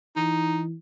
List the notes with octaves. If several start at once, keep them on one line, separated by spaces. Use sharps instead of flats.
E3 D#4